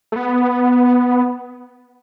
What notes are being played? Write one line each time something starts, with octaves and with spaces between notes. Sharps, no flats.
A3
B3